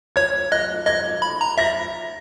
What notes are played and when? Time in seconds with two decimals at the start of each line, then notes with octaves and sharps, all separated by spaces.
0.16 C#5 G#6
0.52 D#5 F#6
0.86 D#5 G#6
1.22 B5
1.41 A#5
1.58 E5 A#6